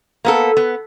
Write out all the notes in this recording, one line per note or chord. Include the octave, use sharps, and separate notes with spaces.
A#3 B3 A4
B3